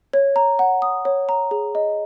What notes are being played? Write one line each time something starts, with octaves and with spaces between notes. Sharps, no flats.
C#5
A#5
F#5
D#6
C#5
A#5
G#4
D#5